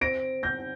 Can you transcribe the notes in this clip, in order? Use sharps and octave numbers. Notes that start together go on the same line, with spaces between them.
C4 A#6 D7
C4 G6 A#6